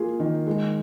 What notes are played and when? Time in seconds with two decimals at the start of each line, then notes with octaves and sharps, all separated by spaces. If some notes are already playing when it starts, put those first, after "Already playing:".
Already playing: A#3 F4 G#4
0.20 D#3
0.47 G#3